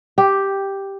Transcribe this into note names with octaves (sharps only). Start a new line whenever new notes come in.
G4